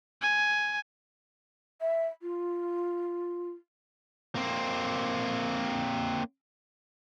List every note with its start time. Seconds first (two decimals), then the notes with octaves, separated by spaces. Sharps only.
0.22 G#5
1.81 E5
2.22 F4
4.35 A#3 C4